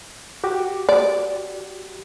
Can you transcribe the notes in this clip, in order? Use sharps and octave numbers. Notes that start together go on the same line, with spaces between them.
F#4 G4 D6
D5